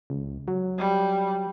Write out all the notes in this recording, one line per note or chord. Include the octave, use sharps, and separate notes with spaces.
C#2
F#3
G3